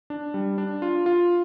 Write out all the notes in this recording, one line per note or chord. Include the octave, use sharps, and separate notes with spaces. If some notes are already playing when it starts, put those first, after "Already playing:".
D4
G3
D4
F4
F4